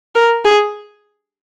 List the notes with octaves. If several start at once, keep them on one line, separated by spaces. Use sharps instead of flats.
A#4
G#4